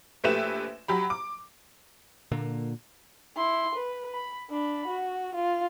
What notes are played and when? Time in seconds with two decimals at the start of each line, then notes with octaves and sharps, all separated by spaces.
0.24 A#1 A3 G4 B4 E5 E7
0.88 F#3 G4 B5
1.10 D6
2.32 A#2 D3 A#3
3.37 E4 C6
3.75 B4
4.12 B5
4.50 D4 B5
4.88 F#4
5.35 F4